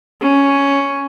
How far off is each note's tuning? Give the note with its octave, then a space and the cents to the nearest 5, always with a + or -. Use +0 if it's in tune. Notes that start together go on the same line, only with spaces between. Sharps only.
C#4 +5